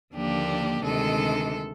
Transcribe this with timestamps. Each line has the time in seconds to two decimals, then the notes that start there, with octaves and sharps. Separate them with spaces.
0.15 D#2 D3 F3 A#3 D4 G4
0.84 D2 C3 D#3 G#3 A4